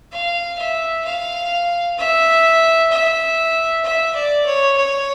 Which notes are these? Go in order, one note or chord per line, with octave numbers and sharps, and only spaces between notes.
F5
E5
F5
E5
E5
E5
D5
C#5
C#5